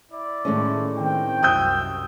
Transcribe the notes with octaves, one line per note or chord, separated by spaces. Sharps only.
E4 D5
A2 D#3 G#3 A3 C#4
D#3 C4 G5
C2 F#2 C3 D#6 E6 G6